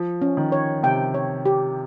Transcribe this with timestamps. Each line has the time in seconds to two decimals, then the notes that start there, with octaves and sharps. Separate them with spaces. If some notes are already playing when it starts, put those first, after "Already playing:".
Already playing: F3
0.22 C#4
0.37 D#3
0.52 C#5
0.83 C3 G5
1.14 C#5
1.46 G4